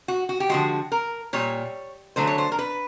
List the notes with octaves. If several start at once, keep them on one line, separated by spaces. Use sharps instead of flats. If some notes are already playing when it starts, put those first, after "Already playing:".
F#4
F#4
G4
D3 F3 G#3 F#4
A#4
A#2 G3 C#5
D3 F#3 A3 C5
C#5
C5
A#4
B4